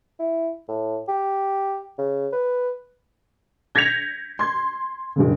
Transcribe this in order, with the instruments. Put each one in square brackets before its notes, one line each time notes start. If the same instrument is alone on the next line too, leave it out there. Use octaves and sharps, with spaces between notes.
[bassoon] E4
A2
G4
C#3
B4
[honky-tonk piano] G6 G#6 A#6 B6 C#7 F7
C6 G#6
F#1 G2 C#3